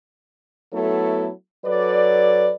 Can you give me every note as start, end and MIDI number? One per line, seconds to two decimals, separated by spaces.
0.73 1.29 54
0.73 1.29 57
0.73 1.29 59
0.73 1.29 64
0.73 1.29 69
1.65 2.52 54
1.65 2.52 69
1.65 2.52 71
1.65 2.52 74